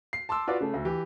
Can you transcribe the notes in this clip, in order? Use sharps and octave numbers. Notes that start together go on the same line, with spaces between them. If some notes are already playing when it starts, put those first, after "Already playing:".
C7
A5 C6 D6 E6
F4 F#4 B4 D5 D6
C#3 A3
D2
E3 G4